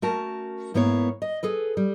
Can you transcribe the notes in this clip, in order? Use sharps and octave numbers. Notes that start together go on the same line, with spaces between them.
A3 C#4 F#4 A#4 A5
G#2 A#3 B3 E4 A4 C#5
D#5
G#4 A4 B4
G3